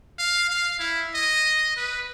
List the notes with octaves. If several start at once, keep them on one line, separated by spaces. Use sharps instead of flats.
F5
F5
E4
D#5
B4